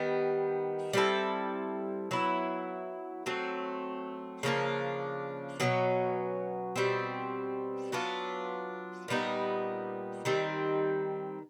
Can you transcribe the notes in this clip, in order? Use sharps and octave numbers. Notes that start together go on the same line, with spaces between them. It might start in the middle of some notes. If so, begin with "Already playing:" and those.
Already playing: D#3 G3 B3
G3 C4 E4 A4
F#3 B3 E4
F#3 A3 C4
C#3 F3 A#3 D4
B2 F#3 A3 C#4
B2 G3 C4
F#3 B3 D4 F4
A#2 G3 B3 D#4
D#3 G3 C4